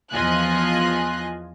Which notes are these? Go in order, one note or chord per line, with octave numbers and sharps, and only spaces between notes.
E2 F3 F4 D#5 G#5 F#6